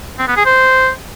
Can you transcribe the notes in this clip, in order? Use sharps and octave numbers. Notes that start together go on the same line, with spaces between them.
C4
B3
G#4
C5